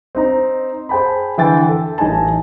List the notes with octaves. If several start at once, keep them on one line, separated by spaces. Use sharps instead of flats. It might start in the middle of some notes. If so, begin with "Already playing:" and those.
C4 D#4 A#5
G#4 C5 G5 A5 B5
D3 E3 G5 A6
A4
A1 D#4 G#5 A5